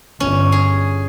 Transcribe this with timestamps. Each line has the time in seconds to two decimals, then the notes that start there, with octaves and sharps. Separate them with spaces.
0.20 G1 C#4
0.52 G#4